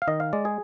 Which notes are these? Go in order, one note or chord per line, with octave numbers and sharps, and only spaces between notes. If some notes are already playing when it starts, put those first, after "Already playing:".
F5
D#3 D#5
F5
G#3 D5
G#4